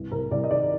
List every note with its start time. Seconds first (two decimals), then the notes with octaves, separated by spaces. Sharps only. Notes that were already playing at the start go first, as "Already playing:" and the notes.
Already playing: C2 G2
0.12 C2 A#4
0.31 C2 D5
0.44 D#5
0.50 D#3 D5